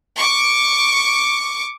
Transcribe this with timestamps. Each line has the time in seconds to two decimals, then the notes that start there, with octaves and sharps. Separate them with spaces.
0.17 C#6 D6